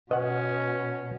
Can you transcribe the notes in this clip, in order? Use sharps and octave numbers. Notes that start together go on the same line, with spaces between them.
B2 C#4 B4 D#5 F#5